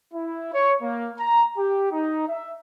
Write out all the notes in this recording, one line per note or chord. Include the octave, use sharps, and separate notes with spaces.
E4
C#5
A#3
A#5
G4
D#4
E5